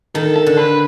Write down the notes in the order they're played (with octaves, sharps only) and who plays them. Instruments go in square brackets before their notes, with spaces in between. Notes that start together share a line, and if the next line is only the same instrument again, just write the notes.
[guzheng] D#3 [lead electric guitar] A4
[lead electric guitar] A4
[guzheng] D3
[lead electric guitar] B4